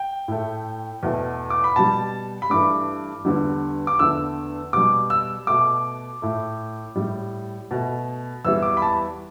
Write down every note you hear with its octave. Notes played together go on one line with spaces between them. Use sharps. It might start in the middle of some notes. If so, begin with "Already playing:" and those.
Already playing: G5
A2 A3
E2 B2 A3
D6
B5
B2 G3 A5
B5
G2 E3 A3 D6
E2 D3 G3
D6
E2 D3 A3 E6
B2 G3 D6
E6
B2 A3 D6
A2 A3
A2 G3
B2 A3
E2 E3 G3 E6
D6
B5
A5